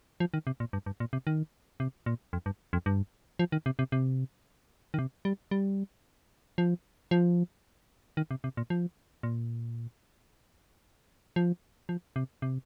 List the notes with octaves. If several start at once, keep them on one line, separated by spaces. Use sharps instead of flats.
F3
D#3
C3
A#2
G2
G2
A#2
C3
D#3
C3
A#2
F2
G2
F2
G2
F3
D#3
C3
C3
C3
D#3
C3
G3
G3
F3
F3
D#3
C3
C3
A#2
F3
A#2
F3
F3
C3
C3